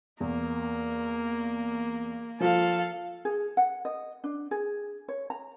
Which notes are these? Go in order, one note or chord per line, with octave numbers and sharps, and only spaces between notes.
E2 A#3
F3 F4 A4 F5
G#4
F#5
D#5
D4
G#4
C#5
A#5